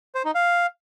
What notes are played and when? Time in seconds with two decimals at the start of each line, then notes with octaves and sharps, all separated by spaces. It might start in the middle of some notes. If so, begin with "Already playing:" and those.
0.15 C5
0.25 D#4
0.35 F5